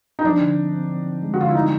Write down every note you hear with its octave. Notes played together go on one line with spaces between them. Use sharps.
D#4
F3 D4
D3
C4
C4
C4
C4
G#3
F#4
D3 F4
E4
D3 D#4